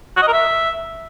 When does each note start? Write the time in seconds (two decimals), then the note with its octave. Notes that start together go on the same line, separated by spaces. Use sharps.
0.17 F#4
0.22 D#5
0.28 A#4
0.33 E5